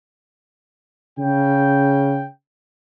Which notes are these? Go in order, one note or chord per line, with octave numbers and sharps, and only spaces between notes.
C#3 G5